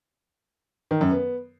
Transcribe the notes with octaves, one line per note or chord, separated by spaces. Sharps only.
D#3
F#2
B3